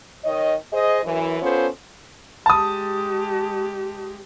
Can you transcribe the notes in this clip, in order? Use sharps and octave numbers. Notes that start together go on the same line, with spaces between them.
D#3 C#5 D#5
G#4 C5 D#5
F#2 E3
B3 C#4 F4 A4 C5
G#3 G4 A5 D#6